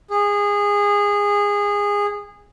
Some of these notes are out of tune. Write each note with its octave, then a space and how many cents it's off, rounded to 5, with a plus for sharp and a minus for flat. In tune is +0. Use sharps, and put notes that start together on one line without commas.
G#4 -20